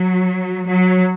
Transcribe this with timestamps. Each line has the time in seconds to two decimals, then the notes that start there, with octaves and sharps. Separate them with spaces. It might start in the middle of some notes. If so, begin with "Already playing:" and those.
Already playing: F#3
0.67 F#3